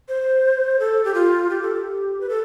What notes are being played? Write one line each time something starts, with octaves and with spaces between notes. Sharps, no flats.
C5
A4
G4
F4
G4
A4
G4
B4
A4